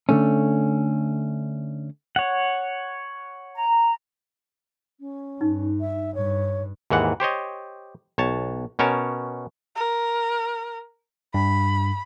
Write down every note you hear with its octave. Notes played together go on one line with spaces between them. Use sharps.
D3 A3 C#4
C#5 F#5
A#5
C#4
G2 D#4
E5
G2 C#5
D#2 G#2 E3 F#5
G4 C5 C#5 D#5
B1 C#5 A5
B2 C#4 A#4 C#5 A5
A#4
G2 B5